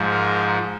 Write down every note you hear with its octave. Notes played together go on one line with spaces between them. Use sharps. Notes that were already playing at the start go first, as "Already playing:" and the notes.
Already playing: G#2 F3
A#4